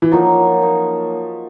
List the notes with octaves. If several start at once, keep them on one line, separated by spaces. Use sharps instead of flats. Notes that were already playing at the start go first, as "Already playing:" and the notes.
E3
F3 F#3 A#3 D#4 F#4
F#3 A#3 D#4 F#4